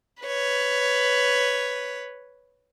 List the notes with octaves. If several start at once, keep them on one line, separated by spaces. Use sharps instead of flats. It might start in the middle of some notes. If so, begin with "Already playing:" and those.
B4 C#5